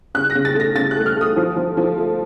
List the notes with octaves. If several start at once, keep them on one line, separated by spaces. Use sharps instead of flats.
C#3 F#6
A#6
C#3
A6
A3
A#6
C#3 A6
F#6
A3
F6
A3 D#6
F3
F3
F3
A3